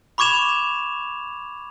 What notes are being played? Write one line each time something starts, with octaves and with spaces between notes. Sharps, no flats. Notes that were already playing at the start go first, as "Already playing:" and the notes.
B5 C#6 D6 G#6 E7 F7